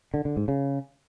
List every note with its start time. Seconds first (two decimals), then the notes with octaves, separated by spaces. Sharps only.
0.14 D3
0.25 D3
0.37 G#2
0.48 C#3